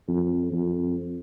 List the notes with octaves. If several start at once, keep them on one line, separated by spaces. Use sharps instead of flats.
F2
F2